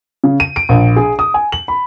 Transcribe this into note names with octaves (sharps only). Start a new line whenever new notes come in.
C#3
D#7
D7
A#1
G#4
D#6
G#5
F#7
B5